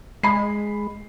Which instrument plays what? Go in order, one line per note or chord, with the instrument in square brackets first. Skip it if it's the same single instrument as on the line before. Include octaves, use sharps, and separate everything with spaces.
[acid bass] G#3 [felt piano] B5 C7